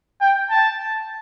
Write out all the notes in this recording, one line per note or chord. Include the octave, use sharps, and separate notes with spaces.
G5
A5